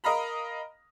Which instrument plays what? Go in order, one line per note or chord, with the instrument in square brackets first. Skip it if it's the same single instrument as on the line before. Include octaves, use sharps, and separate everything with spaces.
[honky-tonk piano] A#4 D#5 F5 A#5 B5